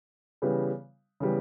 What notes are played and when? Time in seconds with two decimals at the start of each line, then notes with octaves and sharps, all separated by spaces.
0.42 C#3 E3 G3 B3
1.20 C#3 E3 G3 B3